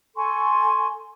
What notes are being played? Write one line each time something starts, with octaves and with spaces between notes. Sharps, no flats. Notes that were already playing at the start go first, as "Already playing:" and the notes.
A4 G#5 C6 C#6